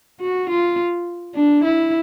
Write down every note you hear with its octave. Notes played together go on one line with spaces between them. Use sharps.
F#4
F4
D4
E4